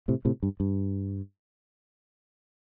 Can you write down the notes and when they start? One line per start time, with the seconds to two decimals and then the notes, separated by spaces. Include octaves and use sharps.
0.08 A2 C3
0.25 A2 C3
0.43 G2
0.60 G2